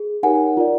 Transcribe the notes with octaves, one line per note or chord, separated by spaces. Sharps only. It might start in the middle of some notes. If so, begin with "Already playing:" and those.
Already playing: G#4
D#4 G4 A#4 C#5 F#5 G#5
F4 A#4 D5